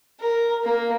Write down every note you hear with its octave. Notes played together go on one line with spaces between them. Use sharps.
A#4
A#3